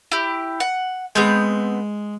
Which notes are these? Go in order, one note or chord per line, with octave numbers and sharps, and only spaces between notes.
E4 G4
F#5
G#3 B3 C4 G6